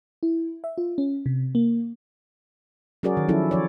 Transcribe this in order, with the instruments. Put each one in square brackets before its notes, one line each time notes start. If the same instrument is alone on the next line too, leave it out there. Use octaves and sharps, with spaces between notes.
[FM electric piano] E4
E5
F4
C#4
C3
A#3
[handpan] F#3 C#4 F#4 G#4 A#4 D5
D#3
F3 F#3 C#4 E4 A4
F3 C#5 D5